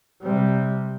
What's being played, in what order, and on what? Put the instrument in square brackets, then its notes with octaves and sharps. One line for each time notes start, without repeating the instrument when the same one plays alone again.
[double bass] C3 G3